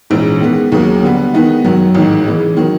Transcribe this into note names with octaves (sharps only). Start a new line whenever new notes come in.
A#1 G#2 E3 G#3 C#4
D#3 G#3 B3
D#2 C#3 F#3 A#3
D3 G3 B3
D#3 G#3 B3 D#4
F#2 D#3 F#3
A1 G#2 D#3
C#3 E3 G#3
D#3 F#3